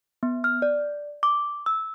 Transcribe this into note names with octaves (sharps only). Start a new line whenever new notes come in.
B3
F6
D5
D6
E6